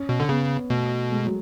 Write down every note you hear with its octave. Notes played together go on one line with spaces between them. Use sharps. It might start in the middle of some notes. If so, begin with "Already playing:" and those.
Already playing: C#4
B2
D3
C#3 B3
B2 A3
G#3
F#3